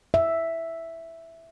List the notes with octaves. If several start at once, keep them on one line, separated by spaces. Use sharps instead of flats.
E5